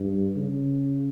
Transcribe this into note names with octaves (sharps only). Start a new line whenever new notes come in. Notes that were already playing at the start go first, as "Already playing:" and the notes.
Already playing: G2
C#3